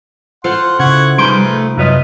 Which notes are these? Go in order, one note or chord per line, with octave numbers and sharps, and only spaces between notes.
F4 A4 C5 F#5 C6
C#3 E4 F#5 C#6 G#6
C2 F3 G3 D#4 G#4 B4 C6 D7
A3
F#2 C3 F#3 B3 F4 B4 C#5 D#5